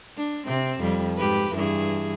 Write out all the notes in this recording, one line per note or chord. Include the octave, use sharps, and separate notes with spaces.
D4
C3 C4
F2 G3
G#2 G4 B4
G2 E3 G#4